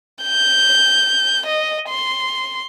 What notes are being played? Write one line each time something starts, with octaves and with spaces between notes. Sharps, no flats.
G6
D#5
C6